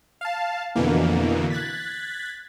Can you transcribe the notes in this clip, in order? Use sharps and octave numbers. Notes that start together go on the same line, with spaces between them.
F5 A5
F2 B2 D3 E3 A#3
F#6 G#6 A6 B6